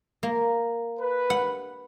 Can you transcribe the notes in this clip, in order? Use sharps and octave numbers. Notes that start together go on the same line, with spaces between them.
A#3
B4
F#5